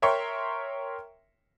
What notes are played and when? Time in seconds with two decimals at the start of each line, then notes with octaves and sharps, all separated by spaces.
0.02 A#4 C#5 E5 G5 C6 C#6